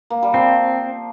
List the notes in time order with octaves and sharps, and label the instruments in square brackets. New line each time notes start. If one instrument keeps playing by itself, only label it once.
[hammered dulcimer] A#3
G3
[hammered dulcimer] F3 [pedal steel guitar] C4